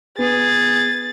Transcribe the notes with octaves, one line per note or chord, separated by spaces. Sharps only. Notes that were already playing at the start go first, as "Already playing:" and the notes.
B3 G#4 A6